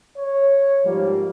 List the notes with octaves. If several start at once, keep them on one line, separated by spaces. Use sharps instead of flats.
C#5
G#2 F3 G3 A#3